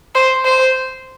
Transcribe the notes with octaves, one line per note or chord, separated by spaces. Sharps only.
C5
C5